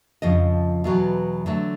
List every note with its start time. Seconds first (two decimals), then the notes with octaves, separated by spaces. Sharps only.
0.22 F2 C#3 F3 D#5
0.84 E2 B2 F#3
1.46 D3 F#3 A3